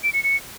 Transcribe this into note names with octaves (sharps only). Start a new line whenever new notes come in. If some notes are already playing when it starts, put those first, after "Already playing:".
D7
C#7
C#7